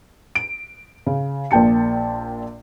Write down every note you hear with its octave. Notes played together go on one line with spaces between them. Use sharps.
D7
C#3
A#1 A#2 G5 A5 C#7